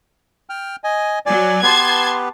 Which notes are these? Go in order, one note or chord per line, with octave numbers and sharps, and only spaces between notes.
G5 F6
D#5 G#5
F#3 D5 G#5
B3 G4 B4 A5 C6 G#6